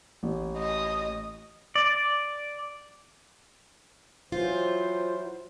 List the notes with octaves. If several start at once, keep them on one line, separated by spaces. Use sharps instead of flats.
A1
D#5
D5
E3 F#3 F4 C5